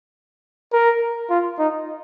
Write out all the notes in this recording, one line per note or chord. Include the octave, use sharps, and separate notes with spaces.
A#4
F4
D#4